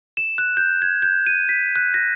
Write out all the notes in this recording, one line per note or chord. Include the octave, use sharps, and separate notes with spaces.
E7
F#6
G6
G#6
G6
D#7
B6
F#6
A#6